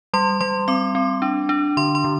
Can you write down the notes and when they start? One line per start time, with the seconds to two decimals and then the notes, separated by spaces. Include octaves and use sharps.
0.14 G3 C6
0.41 G3 C6
0.68 C4 D6
0.95 C4
1.22 D4
1.49 D4
1.77 D3 C6
1.95 C6
2.04 D3